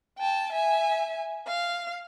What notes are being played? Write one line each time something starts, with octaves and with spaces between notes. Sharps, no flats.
G5 A5
E5 G#5
F5